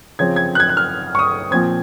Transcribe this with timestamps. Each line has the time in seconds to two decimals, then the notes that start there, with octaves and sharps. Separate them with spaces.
0.19 C#3 F3 C4 G#6
0.36 G#6
0.55 F#6
0.60 G#6
0.69 F#6
0.77 F6
1.15 C#6
1.19 D#6
1.51 A#2 F3 C4 G#6